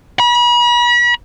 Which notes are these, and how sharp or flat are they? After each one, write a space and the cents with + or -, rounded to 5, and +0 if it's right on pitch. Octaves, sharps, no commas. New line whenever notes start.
B5 -40